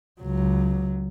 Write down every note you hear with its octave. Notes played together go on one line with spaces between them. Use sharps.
C#2 F#3